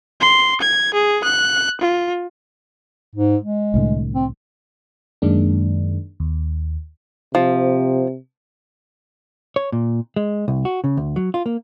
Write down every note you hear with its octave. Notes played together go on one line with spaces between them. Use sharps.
C6
G#6
G#4
F#6
F4
G#2
G#3
C2 A2 D3
C4
F#2 D#3 G#3 A#3 D4
D#2
C3 F3
C#5
A#2
G#3
C2
F#4
C#3
D2
F#3
F4
A#3